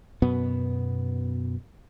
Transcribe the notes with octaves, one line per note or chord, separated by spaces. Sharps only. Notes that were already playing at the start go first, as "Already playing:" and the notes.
F#2 B2 B3